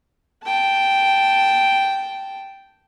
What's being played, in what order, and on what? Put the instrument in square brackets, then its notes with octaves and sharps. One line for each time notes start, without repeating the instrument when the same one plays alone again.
[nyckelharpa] G5 A5